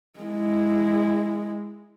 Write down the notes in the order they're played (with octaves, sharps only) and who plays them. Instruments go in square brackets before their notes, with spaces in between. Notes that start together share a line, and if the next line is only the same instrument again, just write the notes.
[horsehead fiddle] G#3 E4